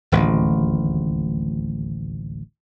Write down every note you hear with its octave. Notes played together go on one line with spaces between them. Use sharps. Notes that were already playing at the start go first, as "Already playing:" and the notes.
D1 A1 D#2